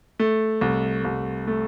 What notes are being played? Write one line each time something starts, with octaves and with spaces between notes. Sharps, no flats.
A3
C2
C2
A3